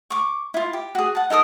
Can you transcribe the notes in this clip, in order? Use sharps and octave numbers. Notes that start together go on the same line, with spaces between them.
C#6 D6
E4 F4
G4
F#4 G#4
F#5 A5
D#4 A4 A#4 D#6